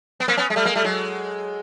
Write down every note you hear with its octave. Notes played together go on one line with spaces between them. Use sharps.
B3
A#3 C4
B3 C#4
G#3
G3 A3
G#3 A#3
G3 A3
F#3 G#3